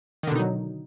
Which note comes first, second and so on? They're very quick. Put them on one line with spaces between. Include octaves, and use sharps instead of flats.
D#3 D3 B2 D#4 F#3